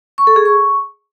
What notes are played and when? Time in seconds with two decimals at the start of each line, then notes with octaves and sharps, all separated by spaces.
0.18 C#6
0.27 A4
0.36 G#4
0.45 C#6